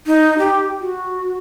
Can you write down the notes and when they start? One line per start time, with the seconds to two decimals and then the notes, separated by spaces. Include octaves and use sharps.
0.07 D#4
0.39 G4
0.81 F#4